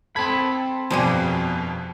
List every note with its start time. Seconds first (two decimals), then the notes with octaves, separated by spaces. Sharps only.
0.16 C4 A4 B5 G#6
0.91 G1 F2 B2 F3 G3 G#4